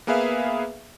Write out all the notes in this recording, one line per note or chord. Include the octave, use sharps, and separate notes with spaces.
A#3 B3 G#4 B4 E5 F5